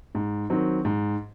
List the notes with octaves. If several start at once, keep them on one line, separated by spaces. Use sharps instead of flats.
G#2
D#3 F#3 C4
G#2